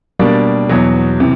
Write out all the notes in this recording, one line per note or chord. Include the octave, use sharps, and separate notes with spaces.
B2 G3 A#3 D4
E2 B2 F#3
C3 E3